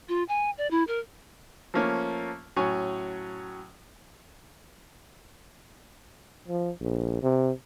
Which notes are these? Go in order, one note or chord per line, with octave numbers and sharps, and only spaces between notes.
F4
G#5
D5
E4
A#4
F3 A3 A#3 C#4
A2 F#3 C#4 G#5 C#6
F3
A#1
C3